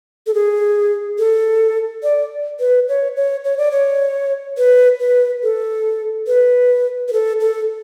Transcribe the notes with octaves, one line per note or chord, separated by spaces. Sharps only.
A4
G#4
A4
D5
B4
C#5
C#5
C#5
D5
C#5
B4
B4
A4
B4
B4
A4
A4